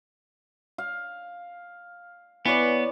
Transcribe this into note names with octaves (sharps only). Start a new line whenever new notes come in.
F5
E3 B3 C#5 D5